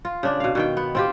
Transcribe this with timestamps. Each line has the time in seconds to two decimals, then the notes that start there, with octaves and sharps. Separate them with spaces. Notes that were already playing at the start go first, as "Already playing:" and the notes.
0.05 F4
0.23 C#3 D4 D5
0.40 B2 F5
0.55 B2 D#3 G5
0.77 B3
0.95 C4 F4 G4